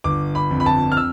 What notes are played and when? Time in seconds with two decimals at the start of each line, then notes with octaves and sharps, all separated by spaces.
0.04 G1 D6
0.35 B5
0.51 F2
0.60 B5
0.66 A5
0.92 F6
0.97 E6